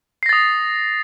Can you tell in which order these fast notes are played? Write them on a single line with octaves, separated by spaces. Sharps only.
C7 A#6 A6 D#6